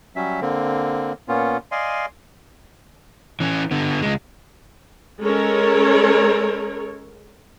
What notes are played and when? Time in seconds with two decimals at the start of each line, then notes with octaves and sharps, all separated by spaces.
0.16 F#3 G3 C#4 E5
0.41 D3 A#3 C4
1.28 A#2 A#3 B3 C#4 F4
1.72 D5 D#5 F5 G#5 C6
3.40 E3 C#4
3.71 D3 B3
4.02 C#2 G#3
5.21 G#3 C#4 A4 A#4 C#5